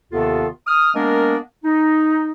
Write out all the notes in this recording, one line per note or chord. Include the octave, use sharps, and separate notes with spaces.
D#2 C3 D#3 B3 F4 A4
D#6 F6
G#3 A#3 B3 D4 A#4
D#4